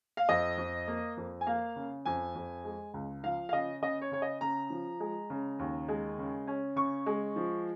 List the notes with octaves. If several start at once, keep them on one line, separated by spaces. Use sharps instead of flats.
F5
F2 D#5
F2
A#3
F2
G#5
A#3 F5
C#3
F2 G#5
F2
G#3
C#2
F3 F5
F5
C#3 D#5
C#3 D#5
C#5
C#3 C#5
D#5
C#3 A#5
F3
G#3
C#3
D#2
G#3
C#3
C#4
C#3 C#6
G#3
F3